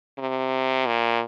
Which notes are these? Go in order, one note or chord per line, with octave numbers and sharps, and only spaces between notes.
C3
A#2